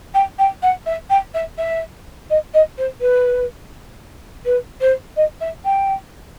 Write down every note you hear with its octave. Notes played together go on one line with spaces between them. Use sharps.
G5
G5
F#5
E5
G5
E5
E5
D#5
D#5
C5
B4
B4
C5
D#5
E5
G5